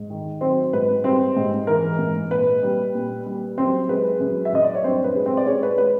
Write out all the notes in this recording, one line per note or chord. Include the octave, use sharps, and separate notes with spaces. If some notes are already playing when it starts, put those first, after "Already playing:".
Already playing: G#2
D#3
F#3 C4 C5
G#2 B4
G3 C4 C5
G#2
E3 A#4
G#2
A#2 B4
G3
A#2
G3
F#2 C4 C5
G#3 B4
F#2
E5
F#2 D#5
D5
C#5
G2 C4 C5
B4
G#3
C4 C5
D5
G#3 C#4 C#5
B4
G#3 B4